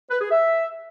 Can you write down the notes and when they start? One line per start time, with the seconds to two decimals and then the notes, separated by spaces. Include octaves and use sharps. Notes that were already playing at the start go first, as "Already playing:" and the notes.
0.09 B4
0.20 G#4
0.31 E5